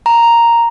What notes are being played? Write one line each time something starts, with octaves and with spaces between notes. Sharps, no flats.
A#5